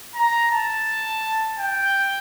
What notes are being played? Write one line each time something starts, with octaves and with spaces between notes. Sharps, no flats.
A#5
A5
G5